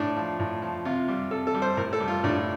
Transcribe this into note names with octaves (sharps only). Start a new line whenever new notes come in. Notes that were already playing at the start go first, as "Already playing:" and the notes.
Already playing: A2 D4
F3
A2
F3
C3 F4
G3
C3 A4
A4
G3
C5
A2 A#4
A4
G3
F4
A2 D4